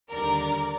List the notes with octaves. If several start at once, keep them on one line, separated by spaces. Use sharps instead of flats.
D#2 D3 G3 A#4 D5